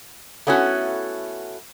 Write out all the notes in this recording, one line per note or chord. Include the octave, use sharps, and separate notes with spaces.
A3 B3 C#4 E4 F#4